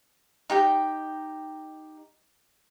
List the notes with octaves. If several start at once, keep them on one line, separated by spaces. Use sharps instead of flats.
D#4 G4 G5